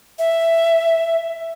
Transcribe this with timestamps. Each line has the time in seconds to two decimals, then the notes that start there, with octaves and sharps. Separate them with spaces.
0.19 E5